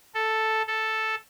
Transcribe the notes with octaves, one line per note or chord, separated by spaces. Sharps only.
A4
A4